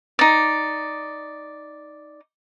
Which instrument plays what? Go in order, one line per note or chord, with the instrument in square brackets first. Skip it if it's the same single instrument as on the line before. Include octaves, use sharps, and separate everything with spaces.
[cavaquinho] D#4 D5